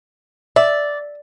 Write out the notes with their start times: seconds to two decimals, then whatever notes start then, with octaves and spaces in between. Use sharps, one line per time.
0.56 D5 E5